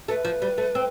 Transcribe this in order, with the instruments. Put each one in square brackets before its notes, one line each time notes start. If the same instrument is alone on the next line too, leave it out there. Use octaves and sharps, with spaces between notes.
[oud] A3 [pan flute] B4
[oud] F3
G3
A3
C4